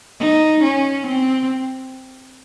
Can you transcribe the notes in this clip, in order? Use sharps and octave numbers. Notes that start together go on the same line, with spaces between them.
D#4
C#4
C4